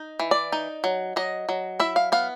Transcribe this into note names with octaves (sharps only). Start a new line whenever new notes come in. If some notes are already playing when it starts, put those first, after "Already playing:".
Already playing: D#4
E3
D5
D#4
F#3
F#3 D#5
F#3
E4 E5
F5
B3 F5